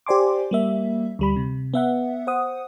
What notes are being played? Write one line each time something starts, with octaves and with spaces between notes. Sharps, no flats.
G4 C5 D5 G#5 C6 D6
G3 A#3 E5
D2 G3 B5
C3
B3 E5 F#5
C5 F#5 D#6